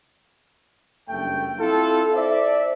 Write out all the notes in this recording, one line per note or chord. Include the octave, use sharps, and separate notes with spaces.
F#1 G2 A3 G5
C4 E4 F4 A4
C5 D5 E5